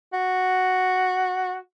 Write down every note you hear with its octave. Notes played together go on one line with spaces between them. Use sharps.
F#4